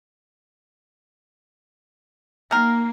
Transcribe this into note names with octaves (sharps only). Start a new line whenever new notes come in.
D#3 A#3 A#4